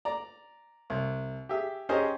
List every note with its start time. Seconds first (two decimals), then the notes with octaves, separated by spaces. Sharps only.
0.05 D5 A#5
0.90 C2
1.49 G4 G#4 E5
1.89 C#4 G4 G#4 A#4 C5 D#5